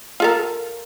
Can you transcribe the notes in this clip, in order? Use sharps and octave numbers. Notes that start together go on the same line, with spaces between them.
F4 A4 A#4